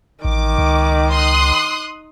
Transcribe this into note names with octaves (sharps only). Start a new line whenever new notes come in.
A1 D#3 D6
C#2
C6 D#6 F#6